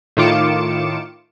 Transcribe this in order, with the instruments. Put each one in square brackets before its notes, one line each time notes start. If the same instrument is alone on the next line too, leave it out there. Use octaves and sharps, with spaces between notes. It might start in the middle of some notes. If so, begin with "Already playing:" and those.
[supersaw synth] A2 D#3 F4 D6 C#7 E7